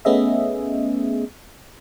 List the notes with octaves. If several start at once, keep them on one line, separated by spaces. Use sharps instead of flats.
A3 B3 C#4 G#4 D#5 E5